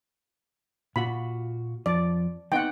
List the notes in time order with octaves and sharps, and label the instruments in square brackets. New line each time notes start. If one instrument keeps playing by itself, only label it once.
[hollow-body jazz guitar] A#2 F4 F#4 [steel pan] B5
[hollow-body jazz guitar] F2 F3 [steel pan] D5
[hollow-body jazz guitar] B3 C4 D#4 [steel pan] F#5 G5